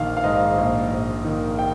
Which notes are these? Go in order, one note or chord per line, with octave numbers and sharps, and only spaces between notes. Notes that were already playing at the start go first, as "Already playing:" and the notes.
Already playing: A#1 D#3 F5
F5
G#2 D#5
A#1
A#1
D#3
G5